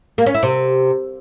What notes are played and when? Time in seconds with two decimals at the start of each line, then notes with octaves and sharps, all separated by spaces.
0.18 A#3
0.26 C#4
0.35 E4
0.43 C3